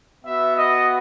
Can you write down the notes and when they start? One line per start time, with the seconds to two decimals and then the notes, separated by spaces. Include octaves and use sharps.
0.25 B3 F#4 E5
0.56 D#5